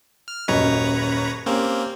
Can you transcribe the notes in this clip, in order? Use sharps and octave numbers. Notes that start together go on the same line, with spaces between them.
F6
D#1 F#2 B4 C#5 D#5 A#5
A#3 C4 C#4 G4